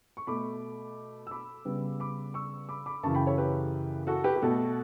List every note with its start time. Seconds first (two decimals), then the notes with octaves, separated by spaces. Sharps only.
0.17 C#6
0.27 B2 A3 B5 D6
1.27 E6
1.31 B5 D6
1.65 C#3 G3 B3
2.00 B5 D6
2.34 C#6 E6
2.69 B5 D6
2.86 B5 D6
3.03 F#2 C#3 E3 A5 C#6
3.15 G5 B5
3.27 A4 C#5
3.38 G4 B4
4.07 F#4 A4
4.24 G4 B4
4.36 G4
4.42 B2 A3 F#4 A4